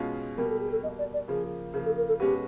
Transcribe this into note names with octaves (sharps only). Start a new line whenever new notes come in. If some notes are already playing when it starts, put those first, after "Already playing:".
Already playing: B2 G#3 C#4 F4
B2 G3 A#3 A#4
A4
G#4
A4
B2 G3 A#3 D#5
D5
D5
C#3 F3 A#3 G#4
C#3 F3 A#3 G#4
A4
A#4
A4
B2 G#3 C#4 F#4 G4 B4